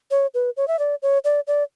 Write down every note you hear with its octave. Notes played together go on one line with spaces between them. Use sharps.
C#5
B4
C#5
E5
D5
C#5
D5
D5